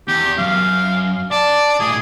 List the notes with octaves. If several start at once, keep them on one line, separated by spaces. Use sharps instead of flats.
E2 G4
F#2 F5
D5 A5
A2 A#3 G#4